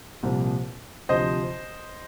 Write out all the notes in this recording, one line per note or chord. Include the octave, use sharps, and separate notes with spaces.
C2 A#2 F3
D2 C3 F3 C5 D#5